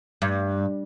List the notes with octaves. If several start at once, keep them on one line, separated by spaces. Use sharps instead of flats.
G2